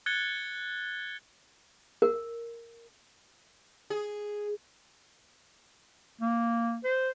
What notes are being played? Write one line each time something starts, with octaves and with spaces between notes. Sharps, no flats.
F#6 G#6 A6 C#7 G7
A#4
G#4
A#3
C5